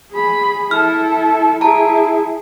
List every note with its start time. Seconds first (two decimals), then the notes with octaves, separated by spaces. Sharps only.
0.11 G#4 B5
0.71 E4 A4 F6
1.61 E4 G#4 A5 A#5